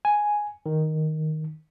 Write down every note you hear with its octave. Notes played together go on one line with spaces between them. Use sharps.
G#5
D#3